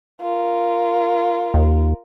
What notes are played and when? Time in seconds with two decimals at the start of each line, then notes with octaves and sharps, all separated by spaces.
0.21 F4 A#4
1.54 D#2